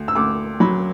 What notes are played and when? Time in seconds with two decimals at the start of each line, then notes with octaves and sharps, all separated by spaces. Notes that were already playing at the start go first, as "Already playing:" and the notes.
Already playing: D2
0.08 E6
0.15 D2 D6
0.60 F#3 B5